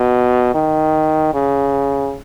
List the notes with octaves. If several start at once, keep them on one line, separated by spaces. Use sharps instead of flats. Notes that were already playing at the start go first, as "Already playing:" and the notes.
Already playing: B2
D#3
C#3